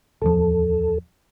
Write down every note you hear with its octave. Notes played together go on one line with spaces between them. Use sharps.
D1 E2 F3 A4